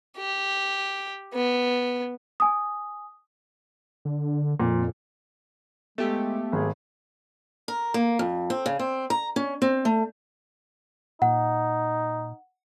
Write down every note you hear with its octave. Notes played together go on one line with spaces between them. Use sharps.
G4
B3
G#5 D#6
D3
F2 A#2
G#3 A3 B3 G4
G#1 G#4
A#4
A#3
F2
C4
C#3
C4
A#5
C#4
C4
A3
A#2 D#4 F#5